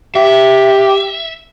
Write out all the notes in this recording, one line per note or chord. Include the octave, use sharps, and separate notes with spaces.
G4 E5